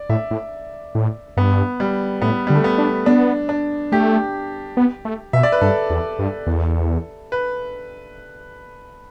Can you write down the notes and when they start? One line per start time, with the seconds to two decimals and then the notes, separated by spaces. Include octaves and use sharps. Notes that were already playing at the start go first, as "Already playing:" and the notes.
Already playing: D5
0.09 A2 E5
0.31 A2
0.95 A2
1.37 G2 B3
1.80 G3
2.22 A2 B3
2.47 D3 G3
2.55 A3
2.64 B3
2.78 D4
3.06 B3 D4
3.49 D4
3.92 A3 G4
4.77 B3
5.05 A3
5.33 B2 E5
5.43 D5
5.52 B4
5.61 G2 A4
5.90 E2
6.19 G2
6.47 E2
7.32 B4